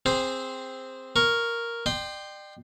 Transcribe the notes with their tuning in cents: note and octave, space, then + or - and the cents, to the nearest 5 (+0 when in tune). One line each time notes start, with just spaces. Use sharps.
C4 +0 G#4 -20 C5 +0
A#4 +0 C#6 +0
D5 +40 G5 +0 C6 +0